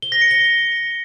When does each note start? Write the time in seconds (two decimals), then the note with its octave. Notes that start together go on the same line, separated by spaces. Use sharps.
0.02 G7
0.12 A#6
0.21 C#7
0.31 G7